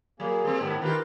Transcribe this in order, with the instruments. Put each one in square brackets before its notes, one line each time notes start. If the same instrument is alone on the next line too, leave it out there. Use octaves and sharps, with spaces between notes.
[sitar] F#3 [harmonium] A#3 G#4
[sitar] G3 C4
[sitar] G#2 [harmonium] D#3 B3
[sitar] D#3 F4 G4 [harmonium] A#4 B4